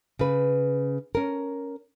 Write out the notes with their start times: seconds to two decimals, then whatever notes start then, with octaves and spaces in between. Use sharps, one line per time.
0.19 C#3 B4
1.15 C#4 A#4